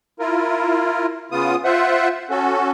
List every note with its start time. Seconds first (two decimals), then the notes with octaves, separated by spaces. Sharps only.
0.20 E4 F4 A#4
1.32 C#3 B3 F4 D#6
1.64 F4 C5 E5 F#5
2.30 C#4 F#4 A4